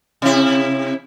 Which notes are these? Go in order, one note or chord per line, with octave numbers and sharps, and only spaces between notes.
C3 E4